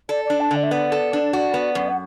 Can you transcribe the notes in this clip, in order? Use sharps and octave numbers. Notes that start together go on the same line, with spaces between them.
A4 D5
D5
D4
A5
D3
D5
E5
B3 D5
A4
D4
F#4
B3
F#2
F#5